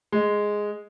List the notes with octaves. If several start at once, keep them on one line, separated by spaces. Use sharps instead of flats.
G#3